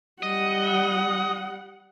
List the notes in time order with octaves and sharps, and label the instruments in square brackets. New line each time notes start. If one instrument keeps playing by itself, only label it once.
[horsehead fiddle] G3 F#5 [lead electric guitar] D#5